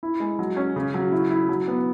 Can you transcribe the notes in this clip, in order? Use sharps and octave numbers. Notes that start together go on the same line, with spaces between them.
E4
G#3
F#3
C#4
C#3
F#3
E4
E4
F#3
B3